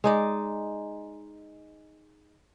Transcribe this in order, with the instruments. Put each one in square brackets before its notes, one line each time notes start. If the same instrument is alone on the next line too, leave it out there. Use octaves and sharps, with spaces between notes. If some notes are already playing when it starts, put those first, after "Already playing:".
[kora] G#3 D#4 D5